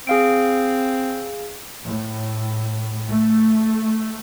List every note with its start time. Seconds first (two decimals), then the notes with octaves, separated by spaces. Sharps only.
0.07 C4 G#4 F5 D7
1.84 A2
3.09 A3